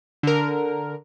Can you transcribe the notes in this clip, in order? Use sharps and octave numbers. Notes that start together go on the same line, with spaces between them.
D3 A#4